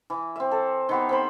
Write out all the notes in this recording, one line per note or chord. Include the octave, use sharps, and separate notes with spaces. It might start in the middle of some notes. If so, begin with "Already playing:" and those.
E3
C4 E5
A4
D#3 B3 G4
C4 C5 B5